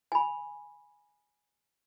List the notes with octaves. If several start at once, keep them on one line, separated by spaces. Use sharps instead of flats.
G#5 B5